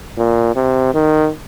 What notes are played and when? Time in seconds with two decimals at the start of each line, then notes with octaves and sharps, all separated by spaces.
0.17 A#2
0.56 C3
0.94 D#3